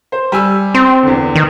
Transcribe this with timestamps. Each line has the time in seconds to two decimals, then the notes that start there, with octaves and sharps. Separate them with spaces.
0.12 C5
0.32 G3 G#5 E6
0.74 C4 C6
1.03 E2 D3
1.36 D#3